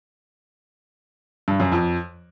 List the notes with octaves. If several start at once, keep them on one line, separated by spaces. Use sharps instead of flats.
G2
F#2
F2